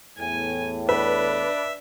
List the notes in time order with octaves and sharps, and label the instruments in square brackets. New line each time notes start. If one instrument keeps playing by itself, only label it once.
[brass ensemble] E2 A2 [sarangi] G#5
[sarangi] D4 [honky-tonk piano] B4 [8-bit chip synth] E5